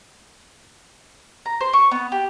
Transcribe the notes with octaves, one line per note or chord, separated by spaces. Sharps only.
A#5
C5
C#6
B3
G4